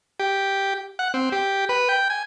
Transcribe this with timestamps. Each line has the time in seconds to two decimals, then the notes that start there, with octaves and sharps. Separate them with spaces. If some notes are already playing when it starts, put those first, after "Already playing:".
0.20 G4
0.99 F#5
1.14 C4
1.32 G4
1.69 B4
1.89 G5
2.10 G#5